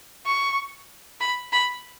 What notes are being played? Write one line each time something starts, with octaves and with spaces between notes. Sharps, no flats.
C#6
B5
B5